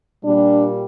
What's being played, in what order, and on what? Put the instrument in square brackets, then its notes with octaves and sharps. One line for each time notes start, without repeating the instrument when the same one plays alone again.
[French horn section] A#2 G3 D4